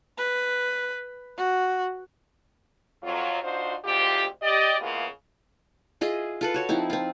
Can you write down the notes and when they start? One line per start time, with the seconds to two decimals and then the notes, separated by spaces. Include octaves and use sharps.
0.18 B4
1.38 F#4
3.03 F2 F#3 F4
3.42 D4 D#4 F4 F#4 C5
3.84 D2 G#2 C4 F4 G4
4.42 G4 D5 D#5
4.80 C#3 E3 G#3 A#3 B3 F4
6.01 F4 G#4 D#5 E5
6.41 F4 A4 B4
6.54 F#4 C#5 A5
6.69 F3 C4 D#4 E4
6.90 C4 F4